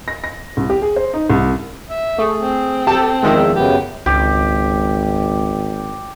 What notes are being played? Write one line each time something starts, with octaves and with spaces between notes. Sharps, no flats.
A#6
A#6
C2
G4
G#4
C5
D#4
C2
E5
A3 G#4
C4
G4 A4 A5
E2 D#3 F3 G#3 E5
F#2 C#3 B3 G4
G#1 C#2 G4